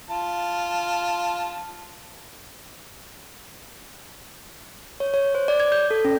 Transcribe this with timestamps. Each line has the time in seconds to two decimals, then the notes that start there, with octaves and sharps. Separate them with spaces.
0.10 F4 A5
5.00 C#5
5.14 C#5
5.35 C5
5.48 D5
5.60 G#6
5.72 G6
5.91 A4
6.05 C#4